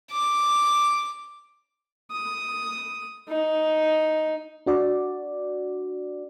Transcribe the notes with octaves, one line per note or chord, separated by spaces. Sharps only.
D6
D#6
D#4
D4 F#4 D5